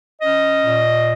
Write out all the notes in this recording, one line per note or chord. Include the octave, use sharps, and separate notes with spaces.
C#4 D#5
A#2